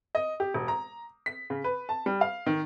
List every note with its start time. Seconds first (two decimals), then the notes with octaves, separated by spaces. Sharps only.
0.15 D#5
0.40 G4
0.54 E1
0.68 A#5
1.26 B6
1.50 C#3
1.64 B4
1.89 A5
2.06 G3
2.21 F5
2.46 D#3